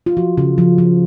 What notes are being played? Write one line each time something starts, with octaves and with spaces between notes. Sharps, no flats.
F4
F3 F#4
C#3
F3
F3